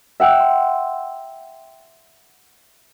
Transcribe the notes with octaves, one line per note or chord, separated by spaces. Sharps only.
E5 F#5 G5 E6
C6